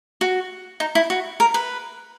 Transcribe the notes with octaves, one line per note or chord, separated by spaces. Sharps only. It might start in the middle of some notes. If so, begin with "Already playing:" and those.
F#4
D#4
E4
F#4
A#4
B4